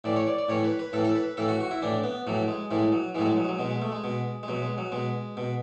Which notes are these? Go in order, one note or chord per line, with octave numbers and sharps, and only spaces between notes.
A2 E3 D5
C#5
D5
D5
A2 E3 C#5
B4
B4
A2 E3 A4
A4
B4
A2 E3 A4
F#4
F#4
E4
A2 E3 D4
B3
A2 E3 F#3
G#3
A2 E3 G#3
F#3
A2 E3 F#3 G#3
G#3
F#3
G#3
F#3
B2 G#3
G#3
A3
G#3
B2
G#3
B2 F#3
G#3
F#3
B2 G#3
B2